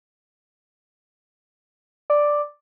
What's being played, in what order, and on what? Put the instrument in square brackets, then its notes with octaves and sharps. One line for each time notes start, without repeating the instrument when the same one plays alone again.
[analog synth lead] D5